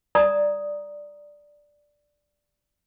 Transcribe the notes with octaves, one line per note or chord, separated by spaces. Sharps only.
D5 A#5 D#6